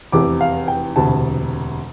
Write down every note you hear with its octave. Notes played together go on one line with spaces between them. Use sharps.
F1 E2 C3 D6
F5
G5
E1 D2 C3 A5